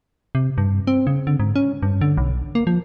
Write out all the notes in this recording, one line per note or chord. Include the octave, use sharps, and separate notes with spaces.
C3
G2
C4
C#3
D3
G#2
C#4
G2
D3
B1
A#3
F3